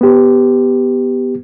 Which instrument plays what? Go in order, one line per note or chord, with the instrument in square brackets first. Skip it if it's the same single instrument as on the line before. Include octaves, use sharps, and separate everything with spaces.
[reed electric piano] B3 G4